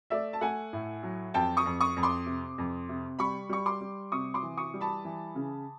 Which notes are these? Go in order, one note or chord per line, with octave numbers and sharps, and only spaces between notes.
A3 D5 E5
A5
A3 F#5 G#5
A2
F#3
F2 G5 A5
C#6 D#6
F2
C#6 D#6
F2
C6 D6
C3
F2
C3
G3 B5 C#6
G3 C#6
C6 D6
G3
C3 C#6 D#6
C6 D6
E3
C#6 D#6
G3
A5 B5
E3
C#3